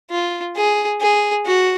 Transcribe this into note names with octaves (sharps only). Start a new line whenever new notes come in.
F4
G#4
G#4
F#4